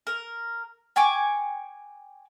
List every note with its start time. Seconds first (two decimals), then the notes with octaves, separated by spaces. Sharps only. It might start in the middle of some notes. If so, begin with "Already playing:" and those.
0.07 A#4
0.96 G5 G#5 C#6 D6